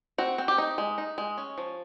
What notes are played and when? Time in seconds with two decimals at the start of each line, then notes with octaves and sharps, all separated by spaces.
0.18 C4 F#4
0.38 C4
0.48 G4
0.58 D#4
0.78 G#3
0.98 D#4
1.18 G#3
1.38 C#4
1.58 F3